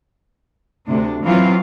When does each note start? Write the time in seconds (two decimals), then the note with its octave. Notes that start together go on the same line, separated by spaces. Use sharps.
0.88 D2 C3 D4
1.25 E3 F#3 C4 F4 F5